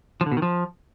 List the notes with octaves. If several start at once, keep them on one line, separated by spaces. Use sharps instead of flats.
F3
D3
B2
D#3
F3